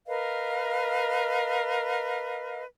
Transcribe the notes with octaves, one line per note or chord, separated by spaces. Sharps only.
A#4 B4 D#5 F5